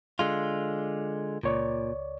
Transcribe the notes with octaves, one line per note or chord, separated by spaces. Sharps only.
D3 G#3 F4
C#2 A#2 C#5 D5